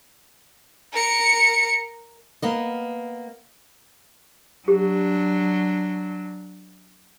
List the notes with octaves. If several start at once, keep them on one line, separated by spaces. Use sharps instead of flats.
A#4 C#7
A#3 B3 D#5
F#3 D4 G4